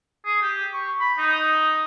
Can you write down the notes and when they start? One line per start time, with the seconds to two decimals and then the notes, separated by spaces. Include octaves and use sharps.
0.25 G#4
0.42 G4
0.74 C#6
1.00 B5
1.18 D#4